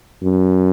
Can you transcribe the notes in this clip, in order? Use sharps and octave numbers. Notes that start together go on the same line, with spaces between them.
F#2